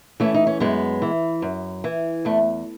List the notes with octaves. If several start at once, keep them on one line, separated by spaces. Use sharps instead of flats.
E3 A3 C#4
D#4
C#4
F#2 G#3 B3
E3
F#2
E3
E2 A3